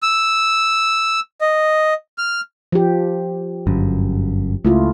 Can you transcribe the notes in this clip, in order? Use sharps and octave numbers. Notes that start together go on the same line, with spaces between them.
E6
D#5
F6
F3 G4
G1 F#2
C#2 A3 E4 F4